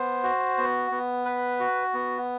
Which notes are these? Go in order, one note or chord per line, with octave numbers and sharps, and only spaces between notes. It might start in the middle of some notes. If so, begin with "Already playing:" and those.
Already playing: B3 C5
F#4
B3
B3
B4
F#4
B3